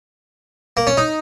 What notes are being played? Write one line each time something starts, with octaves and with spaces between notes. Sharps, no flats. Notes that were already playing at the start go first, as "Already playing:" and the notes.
A#3
C#4
D#4